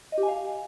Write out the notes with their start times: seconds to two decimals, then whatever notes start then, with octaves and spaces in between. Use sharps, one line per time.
0.12 D#5
0.18 G4
0.23 G#5
0.28 F5